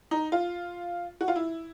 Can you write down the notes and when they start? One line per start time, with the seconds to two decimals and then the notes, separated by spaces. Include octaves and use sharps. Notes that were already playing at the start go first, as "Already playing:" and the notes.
0.11 D#4
0.32 F4
1.21 F#4
1.28 F4
1.36 E4